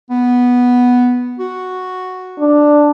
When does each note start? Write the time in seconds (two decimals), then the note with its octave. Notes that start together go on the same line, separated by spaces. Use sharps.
0.10 B3
1.40 F#4
2.39 D4